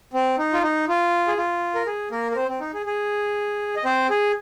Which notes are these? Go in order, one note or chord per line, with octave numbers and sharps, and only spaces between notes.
C4
D#4
F4
D#4
F4
G#4
F4
A#4
G#4
A#3 A#4
A#4
C4 C5
C4
D#4
G#4
G#4
D#5
C4 C5
G#4